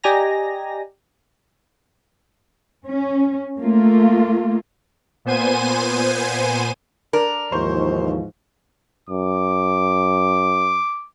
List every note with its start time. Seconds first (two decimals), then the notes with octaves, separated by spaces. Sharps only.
0.04 G4 D5 D#5 G#5 A#5 A#6
2.86 C#4
3.61 A3 A#3 F4
5.25 A#2 B3 C5 G#5 D#7
7.13 D4 A#4
7.52 D#2 G#2 E3 F3 C5 C#6
9.09 F#2 D6